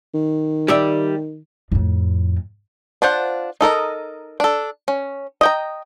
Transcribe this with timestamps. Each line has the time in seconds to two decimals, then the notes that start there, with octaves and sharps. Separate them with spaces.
0.14 D#3
0.68 G3 D5 E5
1.71 F2 A2
3.02 D4 F4 C5 F#5
3.61 D#4 A4 A#4 D#5
4.40 D4 A4
4.88 C#4
5.41 D#5 G5 A#5